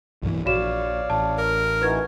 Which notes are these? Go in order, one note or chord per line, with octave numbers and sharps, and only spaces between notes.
B1 G2 E3
A#1 F#4 C#5 D5 F5 E7
A1 A5
A#4
E3 D#4 F#4 B4 G#6